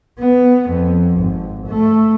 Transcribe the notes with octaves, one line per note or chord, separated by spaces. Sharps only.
B3
F2
G#1
A3